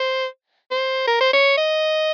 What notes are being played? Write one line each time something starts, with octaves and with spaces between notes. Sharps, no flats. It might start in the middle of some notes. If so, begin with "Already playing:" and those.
Already playing: C5
C5
A#4
C5
C#5
D#5